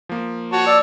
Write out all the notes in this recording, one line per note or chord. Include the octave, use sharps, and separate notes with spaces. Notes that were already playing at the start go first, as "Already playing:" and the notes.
F3 A#3
F#4 C#5 A5 C#6
D5 E6